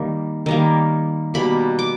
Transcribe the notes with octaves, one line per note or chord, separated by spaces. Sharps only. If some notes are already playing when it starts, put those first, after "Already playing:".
Already playing: D#3 G3 A#3
D#3 G3 A#3
B2 G3 A#3 B5
D6